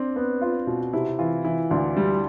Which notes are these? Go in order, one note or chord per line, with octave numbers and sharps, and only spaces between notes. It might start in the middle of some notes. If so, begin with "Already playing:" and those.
Already playing: C4 D4
B3
F4
B2
C3 E4
E3 F4
E3 E4
D2 D4
G3